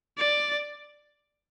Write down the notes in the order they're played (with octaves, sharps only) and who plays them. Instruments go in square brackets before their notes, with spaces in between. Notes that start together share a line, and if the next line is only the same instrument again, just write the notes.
[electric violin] D5